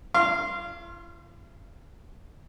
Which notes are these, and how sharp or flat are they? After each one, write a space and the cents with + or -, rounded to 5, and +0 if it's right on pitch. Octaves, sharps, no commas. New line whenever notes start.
E4 +45 F5 -20 C6 +20